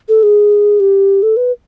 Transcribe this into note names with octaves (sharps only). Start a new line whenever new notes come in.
A4
G#4
G4
A4
B4